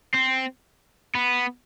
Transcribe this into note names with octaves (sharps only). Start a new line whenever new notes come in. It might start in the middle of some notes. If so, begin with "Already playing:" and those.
C4
B3